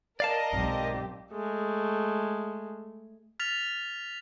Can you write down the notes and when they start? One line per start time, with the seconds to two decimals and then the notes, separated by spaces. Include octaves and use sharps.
0.20 A#4 D5 D#5 F5 A5
0.53 B1 G#2 C4 G4
1.32 G#3 A3
3.40 F6 A6 B6 F7